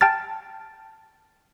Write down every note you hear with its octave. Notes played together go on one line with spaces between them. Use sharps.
G5 A5 F6 A6